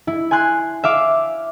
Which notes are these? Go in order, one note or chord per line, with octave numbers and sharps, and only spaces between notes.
E4
G#5 C6 F#6 G#6
E5 F5 D6